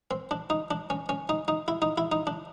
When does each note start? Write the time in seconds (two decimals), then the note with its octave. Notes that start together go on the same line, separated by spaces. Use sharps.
0.11 C4
0.31 D4
0.50 D#4
0.71 D4
0.90 C#4
1.09 C#4
1.29 D#4
1.48 D#4
1.68 E4
1.82 D#4
1.98 E4
2.12 D#4
2.27 D4